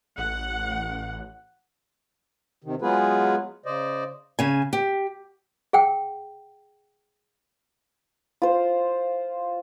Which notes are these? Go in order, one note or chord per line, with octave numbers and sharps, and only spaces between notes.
A1 F#5
C3 D#3
F#3 G#3 B3 F4 G#4 B4
C#3 C5 D5 D#5
C#3 G#5
G4
G#4 F#5 G5
F4 C5